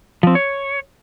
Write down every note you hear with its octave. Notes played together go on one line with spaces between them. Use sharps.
F3 C4
C#5